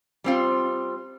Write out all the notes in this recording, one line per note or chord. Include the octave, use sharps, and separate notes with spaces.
G3 C4 F4